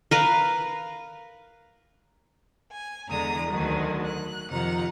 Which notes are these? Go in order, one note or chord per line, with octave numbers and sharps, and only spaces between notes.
A#4 B4 F5
G#5
E2 D3 E3 G#3 A#5 D#6
D2 D3 D#3 F#3
F#6
F2 C3 D#3 F4 F#5 A#5